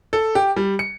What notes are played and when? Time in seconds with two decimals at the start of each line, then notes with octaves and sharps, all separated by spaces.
0.13 A4
0.35 G4
0.56 G3
0.79 C#7